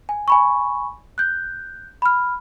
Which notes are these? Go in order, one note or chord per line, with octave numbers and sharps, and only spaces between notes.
G#5
G#5 B5 C#6
F#6 G6
B5 F6